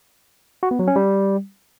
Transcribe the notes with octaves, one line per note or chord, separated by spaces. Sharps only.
F#4
B3
F#3
C#4
G3